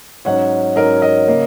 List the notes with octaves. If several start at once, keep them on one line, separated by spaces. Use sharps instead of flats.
G#2 F#3 C#4 C#5 F#5
G#2 F#3 C#4 A#4 D#5
A#4 D#5
C#3 A#3 C#4